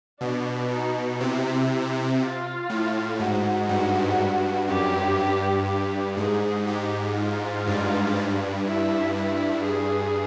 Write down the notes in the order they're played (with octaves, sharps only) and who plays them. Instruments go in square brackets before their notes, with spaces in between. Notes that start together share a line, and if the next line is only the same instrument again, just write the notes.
[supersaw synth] B2 [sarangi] D4
[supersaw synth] B2 [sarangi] D#4
[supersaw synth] C3 [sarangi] E4
[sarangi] F4
[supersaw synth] A2
[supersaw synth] G#2 [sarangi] F#4
[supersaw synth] G2 [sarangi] F#4
[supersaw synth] F#2 [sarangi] G4
[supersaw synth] G2
[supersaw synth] G2 [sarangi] G4
[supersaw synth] G#2 [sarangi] G#4
[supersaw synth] G#2 [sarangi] G4
[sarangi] F4
[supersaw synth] G2
G2
[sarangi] E4
[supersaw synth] G2 [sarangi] E4
[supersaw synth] G2 [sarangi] G#4